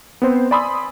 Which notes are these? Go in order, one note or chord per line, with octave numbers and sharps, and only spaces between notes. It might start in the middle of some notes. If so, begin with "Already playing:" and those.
B3 C4 C5
D5 G#5 B5 C6 D#6 E6